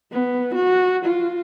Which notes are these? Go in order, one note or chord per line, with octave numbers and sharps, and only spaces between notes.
B3
F#4
F4